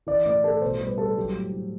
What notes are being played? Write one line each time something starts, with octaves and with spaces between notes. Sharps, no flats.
E3 D5
A2 D5
A2 A4
B2 C5
G3 B4
G3 A4
F#3 G4
A2
A2